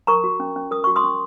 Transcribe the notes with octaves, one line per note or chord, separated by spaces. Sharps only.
A#4 A#5 C#6
F#4
C#4
C#4
A#4 D#6
F#4 C#6
C6 D#6
C#4